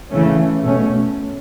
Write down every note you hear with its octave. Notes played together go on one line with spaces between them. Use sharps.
C#3 E3 A3 C#4
B2 A3 C#4